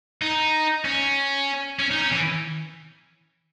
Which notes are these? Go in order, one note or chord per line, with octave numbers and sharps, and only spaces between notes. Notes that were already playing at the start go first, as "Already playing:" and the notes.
D#4
C#4
C#4
D#4
C#4
E3